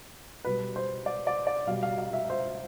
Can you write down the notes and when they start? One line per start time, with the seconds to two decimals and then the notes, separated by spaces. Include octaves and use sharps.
0.45 B2 G3 B4
0.76 C5
1.06 D5
1.27 D5
1.47 D5
1.67 B2 G3 F5
1.83 F5
1.98 F5
2.13 E5
2.30 C5